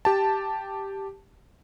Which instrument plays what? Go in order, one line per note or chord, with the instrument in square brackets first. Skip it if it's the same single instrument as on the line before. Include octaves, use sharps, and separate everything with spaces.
[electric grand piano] G4 A5